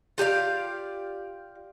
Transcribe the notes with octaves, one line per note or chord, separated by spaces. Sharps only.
F4 G4 D5 F5